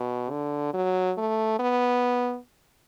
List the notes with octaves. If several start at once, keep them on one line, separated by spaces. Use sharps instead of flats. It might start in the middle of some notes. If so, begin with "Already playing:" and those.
Already playing: B2
D3
F#3
A3
B3